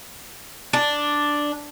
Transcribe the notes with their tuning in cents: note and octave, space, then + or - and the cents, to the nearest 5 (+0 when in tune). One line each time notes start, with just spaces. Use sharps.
D4 +0